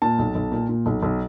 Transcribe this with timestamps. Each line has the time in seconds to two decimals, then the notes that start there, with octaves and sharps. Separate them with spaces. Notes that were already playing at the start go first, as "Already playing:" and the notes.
0.02 A#2 A5
0.19 B1
0.35 B1
0.52 A#2
0.69 A#2
0.86 B1
1.03 B1